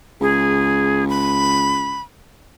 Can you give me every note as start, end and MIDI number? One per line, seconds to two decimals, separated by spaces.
0.21 2.04 37
0.21 1.04 68
1.09 2.00 83